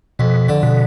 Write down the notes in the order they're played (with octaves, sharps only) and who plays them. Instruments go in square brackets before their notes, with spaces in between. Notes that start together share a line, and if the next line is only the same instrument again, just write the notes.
[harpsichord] F2 [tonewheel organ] B2
[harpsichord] D3
[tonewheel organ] B2